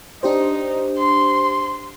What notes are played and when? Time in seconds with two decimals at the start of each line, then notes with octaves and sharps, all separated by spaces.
0.23 D4 D#4 G4 C5
0.98 C6